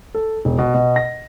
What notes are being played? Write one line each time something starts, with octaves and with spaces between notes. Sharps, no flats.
A4
E1
B2
B2
A#6